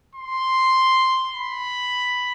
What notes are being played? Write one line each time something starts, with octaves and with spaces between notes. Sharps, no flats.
C6
B5